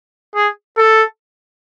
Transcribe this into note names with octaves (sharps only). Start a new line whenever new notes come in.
G#4
A4